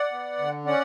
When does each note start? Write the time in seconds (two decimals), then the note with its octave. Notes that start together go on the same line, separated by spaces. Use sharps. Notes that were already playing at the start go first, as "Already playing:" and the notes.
Already playing: D5 F#5
0.12 B3
0.39 D3
0.66 C#4 D5 F#5